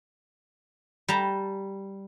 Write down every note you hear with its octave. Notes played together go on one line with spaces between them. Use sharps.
G3 A5 A#5